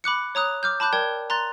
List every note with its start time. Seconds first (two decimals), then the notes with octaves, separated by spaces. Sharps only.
0.04 B5 D6 F#6 C#7
0.35 C#5 A#5 D#6 F#6
0.63 D6 F6 G6
0.80 A5 B5 D6 F#6 G6
0.93 A#4 D5 G5 G#6
1.30 A#5 C6 F#6 A6